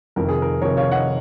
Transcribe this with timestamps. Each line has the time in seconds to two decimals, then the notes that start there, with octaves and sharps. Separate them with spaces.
0.16 F1 F2 D#3 A#4
0.29 G#4
0.42 A#4
0.62 F1 F2 D#3 A#4 C#5
0.77 C#5 F5
0.91 D#5 F#5